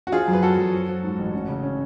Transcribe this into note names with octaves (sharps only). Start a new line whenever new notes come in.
F#4
F3 F4 G#4
F#2
B4
F#2 F#4 A4
F#2
F3
F3
G#2
A1
C#4
C#3
C#4